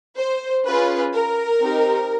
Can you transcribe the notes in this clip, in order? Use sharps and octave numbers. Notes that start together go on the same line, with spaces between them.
C5
C#4 F4 G#4 B4
A#4
C4 D#4 G4